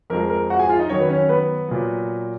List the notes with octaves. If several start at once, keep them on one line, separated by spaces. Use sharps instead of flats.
F2 F3 G#3 A#4
A#4
F#4 F#5
G#4 G#5
F4 F5
D#4 D#5
F#2 D#3 F#3 C#5
B4
C#4 C#5
B3 B4
A#2 F#3